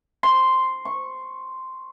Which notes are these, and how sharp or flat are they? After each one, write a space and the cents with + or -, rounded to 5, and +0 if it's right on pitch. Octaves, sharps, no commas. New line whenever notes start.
C6 -5
C#6 -15